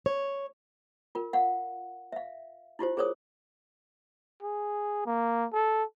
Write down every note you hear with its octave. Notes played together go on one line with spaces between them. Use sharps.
C#5
F4 A#4
F5 F#5
E5 F5
E4 F4 G4 C5
G#4 A#4 C5 C#5 D#6
G#4
A#3
A4